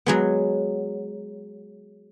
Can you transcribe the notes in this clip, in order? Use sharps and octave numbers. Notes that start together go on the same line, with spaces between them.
F#3 G#3 B3